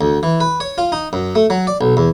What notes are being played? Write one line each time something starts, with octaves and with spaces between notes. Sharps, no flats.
D2
E3
B4
C#5
F4
D#4
F#2
A3
F#3
D5
B1
E2